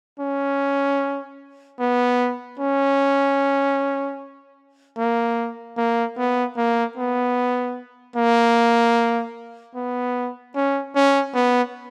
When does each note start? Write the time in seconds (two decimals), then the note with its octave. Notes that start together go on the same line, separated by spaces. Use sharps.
0.20 C#4
1.79 B3
2.59 C#4
4.98 A#3
5.77 A#3
6.17 B3
6.57 A#3
6.97 B3
8.16 A#3
9.75 B3
10.55 C#4
10.95 C#4
11.34 B3